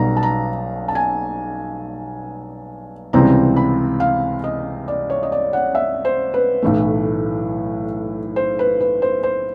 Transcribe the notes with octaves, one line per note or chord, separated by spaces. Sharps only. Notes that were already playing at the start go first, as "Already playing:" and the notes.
Already playing: B1 B2 G3 A#5
A5
A#5
A5
G#5
C#2 C3 E3 G3 C4 A#5
B5
F5
D#5
D5
C#5
D#5
D5
F#5
E5
C5
B4
B1 A2 E3 A3
C5
B4
B4
C5
C5